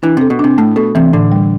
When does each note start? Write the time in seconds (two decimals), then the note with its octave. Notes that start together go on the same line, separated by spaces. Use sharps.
0.03 E3 D4
0.17 C3 A4
0.30 B2
0.39 C3 D4
0.58 A2 A3
0.76 B2 A4
0.95 C3 E3
1.13 A2 D3
1.32 G3